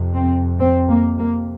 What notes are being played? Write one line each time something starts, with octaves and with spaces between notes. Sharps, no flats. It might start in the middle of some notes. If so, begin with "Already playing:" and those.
Already playing: F2 C3
C4
C4
A#3
A#3